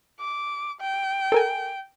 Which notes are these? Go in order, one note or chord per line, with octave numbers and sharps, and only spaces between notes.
D6
G5
A4 A#4 G#5